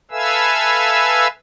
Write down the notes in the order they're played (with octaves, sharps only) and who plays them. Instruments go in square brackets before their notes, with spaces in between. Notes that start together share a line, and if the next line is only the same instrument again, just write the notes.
[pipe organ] A4 B4 E5 F5 G#5 E6